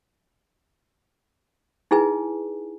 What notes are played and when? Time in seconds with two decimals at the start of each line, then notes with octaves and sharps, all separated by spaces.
1.91 D#4 E4 G#4 B4 G#5